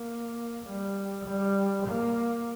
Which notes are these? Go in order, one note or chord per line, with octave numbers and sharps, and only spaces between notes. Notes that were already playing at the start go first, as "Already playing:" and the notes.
Already playing: A#3
G3
G3
A#3